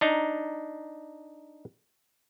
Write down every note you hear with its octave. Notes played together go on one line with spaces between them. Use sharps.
D4 D#4 A#5